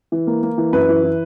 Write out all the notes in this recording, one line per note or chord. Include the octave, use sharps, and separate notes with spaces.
E3
A#3
A#3
E3
F#2 B4
E3
E4